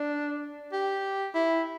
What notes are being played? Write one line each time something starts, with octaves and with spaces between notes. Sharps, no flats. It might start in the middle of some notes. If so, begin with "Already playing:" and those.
Already playing: D4
G4
E4